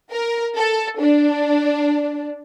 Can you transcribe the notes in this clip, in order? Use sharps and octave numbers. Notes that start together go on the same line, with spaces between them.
A#4
A4
D4